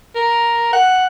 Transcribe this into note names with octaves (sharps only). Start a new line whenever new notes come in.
A#4
F#5